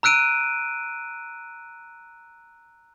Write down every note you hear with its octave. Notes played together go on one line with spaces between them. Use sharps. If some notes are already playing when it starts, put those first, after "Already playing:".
A#5 E6 F#6 D7 D#7